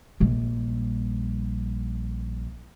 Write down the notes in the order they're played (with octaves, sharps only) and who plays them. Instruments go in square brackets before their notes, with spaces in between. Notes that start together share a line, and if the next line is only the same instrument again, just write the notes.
[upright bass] A#1 G3